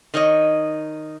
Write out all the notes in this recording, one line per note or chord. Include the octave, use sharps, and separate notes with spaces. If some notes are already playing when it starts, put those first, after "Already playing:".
D#3 D#4 C#5 D#5